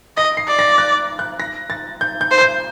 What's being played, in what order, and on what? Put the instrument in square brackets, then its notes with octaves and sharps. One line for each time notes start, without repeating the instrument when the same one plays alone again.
[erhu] D#5 [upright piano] A#6
[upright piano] C7
[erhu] D5
[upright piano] A#6
F#6
F#6
A#6
A6
G6
G6
[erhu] C5
[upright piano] G6